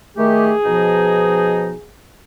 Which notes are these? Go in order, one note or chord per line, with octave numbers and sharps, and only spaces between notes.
D#3 A3 G4 G#4
B2 F3 D#4